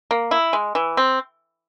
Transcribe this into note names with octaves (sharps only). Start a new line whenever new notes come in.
A#3
E4
G#3
E3
C4